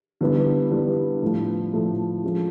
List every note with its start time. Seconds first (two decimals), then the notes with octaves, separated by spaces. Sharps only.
0.21 G2 D3 G3 B3 E4
0.71 G2 D3 G3 B3 E4
1.22 A2 F3 A3
1.73 A2 F3 A3
2.24 F3 G#3 C#4